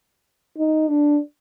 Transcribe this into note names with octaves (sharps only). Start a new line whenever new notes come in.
D#4
D4